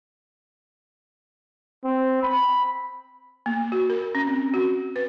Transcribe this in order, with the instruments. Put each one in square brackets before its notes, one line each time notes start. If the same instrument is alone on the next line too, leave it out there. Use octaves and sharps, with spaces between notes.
[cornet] C4
B5
[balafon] A#3
F#4
A#4
C#4
C4
F#4
B4